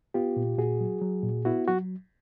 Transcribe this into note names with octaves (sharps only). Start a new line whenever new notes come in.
B3 F4 G4
A#2
A#2 F#4 G#4
F#3
F#3
A#2
B3 E4 F#4
F#3 F#4